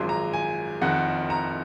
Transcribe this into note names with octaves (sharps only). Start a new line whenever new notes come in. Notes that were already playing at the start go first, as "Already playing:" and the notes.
Already playing: G#1 F#2 F3 G#3 C6
A#5
G#5
F#1 F2 D#3 F#5
A#5